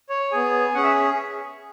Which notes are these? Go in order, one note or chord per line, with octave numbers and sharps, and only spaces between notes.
C#5
B3 G#4 G#5
C#4 G#4 F#5
E5